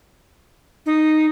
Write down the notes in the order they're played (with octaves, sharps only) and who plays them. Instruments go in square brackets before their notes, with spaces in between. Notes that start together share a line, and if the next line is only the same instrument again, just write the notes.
[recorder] D#4